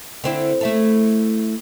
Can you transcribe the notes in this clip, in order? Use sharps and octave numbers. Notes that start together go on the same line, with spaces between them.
D3 C4 E4
A3 E4 A4